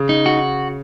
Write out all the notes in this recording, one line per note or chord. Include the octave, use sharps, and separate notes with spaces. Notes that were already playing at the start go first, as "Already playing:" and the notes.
Already playing: C#3
D#4
F#4